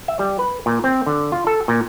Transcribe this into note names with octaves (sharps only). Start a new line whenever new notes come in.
E5
G3
B4
A#2
C4
D3
F4
A4
A#2